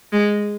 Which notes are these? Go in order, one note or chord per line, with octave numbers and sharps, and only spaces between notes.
G#3